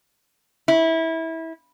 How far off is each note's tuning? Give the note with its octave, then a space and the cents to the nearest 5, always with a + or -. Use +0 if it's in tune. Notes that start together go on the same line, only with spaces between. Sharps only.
E4 -20